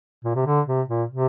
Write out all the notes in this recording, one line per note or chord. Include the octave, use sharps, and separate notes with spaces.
A#2
C3
D3
C3
A#2
C3